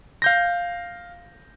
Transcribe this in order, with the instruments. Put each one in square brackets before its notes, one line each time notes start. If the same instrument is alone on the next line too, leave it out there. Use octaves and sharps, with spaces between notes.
[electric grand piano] F5 G6 A#6